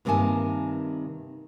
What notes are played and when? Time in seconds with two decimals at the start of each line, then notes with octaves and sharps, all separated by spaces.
0.05 G2 C3 D#3 A#3 G#5 A5